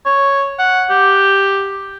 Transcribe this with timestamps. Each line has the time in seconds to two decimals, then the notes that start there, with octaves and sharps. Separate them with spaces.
0.06 C#5
0.59 F#5
0.90 G4